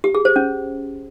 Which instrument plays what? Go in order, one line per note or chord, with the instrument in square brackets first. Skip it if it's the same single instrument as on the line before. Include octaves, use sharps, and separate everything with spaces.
[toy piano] G4
G#4
C5
C#4